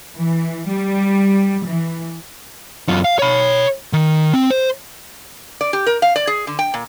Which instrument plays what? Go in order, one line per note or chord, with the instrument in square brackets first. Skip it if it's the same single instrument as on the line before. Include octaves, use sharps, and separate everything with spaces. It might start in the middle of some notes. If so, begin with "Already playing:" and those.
[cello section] E3
G3
E3
[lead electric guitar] F#2 F4
F5
C#5 B5
D#3
C4
C5
[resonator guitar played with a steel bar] D5
G4
A#4
F5
D5
G#4
D3
G5
A#2